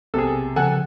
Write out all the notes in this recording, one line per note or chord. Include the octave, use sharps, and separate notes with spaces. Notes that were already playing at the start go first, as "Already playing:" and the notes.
B1 C3 B3 G#4 A4
C#3 F3 A4 F#5 G#5